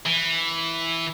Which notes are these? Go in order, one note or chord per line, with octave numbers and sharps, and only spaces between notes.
E3